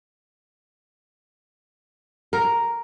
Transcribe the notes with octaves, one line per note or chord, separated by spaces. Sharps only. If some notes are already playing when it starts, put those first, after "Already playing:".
A#4